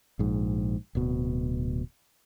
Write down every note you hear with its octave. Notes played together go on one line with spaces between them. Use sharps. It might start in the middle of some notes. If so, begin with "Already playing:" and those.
A#1 G#2
D1 B2